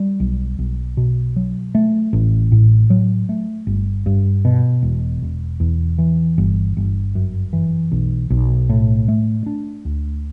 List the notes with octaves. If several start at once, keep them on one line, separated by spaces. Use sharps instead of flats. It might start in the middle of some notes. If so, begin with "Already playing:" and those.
Already playing: G3
B1
B1
B2
F#3
A3
A1
A2
F#3
A3
G1
G2
B2
E1
E1
E2
E3
G1
G1
F#2
E3
B1
B1
A2
A3
D4
D2